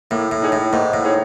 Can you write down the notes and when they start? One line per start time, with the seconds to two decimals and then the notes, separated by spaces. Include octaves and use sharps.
0.11 A2 A#3
0.31 A2
0.42 D#4 G#4 C#5
0.52 A2
0.73 G#2 A#3
0.94 A2
1.04 D#4 G#4 C#5